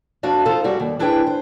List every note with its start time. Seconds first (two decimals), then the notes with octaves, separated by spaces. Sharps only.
0.23 F2 D4 F#4 F5
0.45 D#4 F4 A4 C5 F5
0.64 F#2 G3 F#4
0.80 D#2
0.99 F2 D4 E4 G#4 B4 G5
1.27 C5